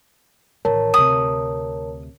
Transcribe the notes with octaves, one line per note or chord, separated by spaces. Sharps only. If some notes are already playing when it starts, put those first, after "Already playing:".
A1 D#3 A#4 C#5 A5
D2 C3 D#6